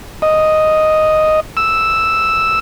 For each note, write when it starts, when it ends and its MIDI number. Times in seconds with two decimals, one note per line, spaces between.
0.22 1.40 75
1.57 2.59 88